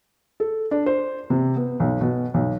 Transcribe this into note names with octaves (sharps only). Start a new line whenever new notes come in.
A4
D4
C5
C3
B3
B1
B2
B1